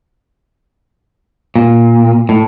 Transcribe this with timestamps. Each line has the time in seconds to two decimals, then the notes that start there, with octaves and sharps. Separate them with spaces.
1.55 A#2
2.29 A2